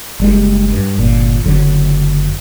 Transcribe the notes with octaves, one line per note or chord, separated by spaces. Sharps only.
F#1 G3 G#3
G2
G1 A#2
F#1 D3 F#3